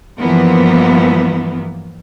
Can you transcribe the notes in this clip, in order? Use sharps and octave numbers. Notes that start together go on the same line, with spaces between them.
G2 E3 F3 A#3 B3